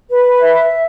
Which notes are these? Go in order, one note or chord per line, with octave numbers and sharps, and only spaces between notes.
B4
E5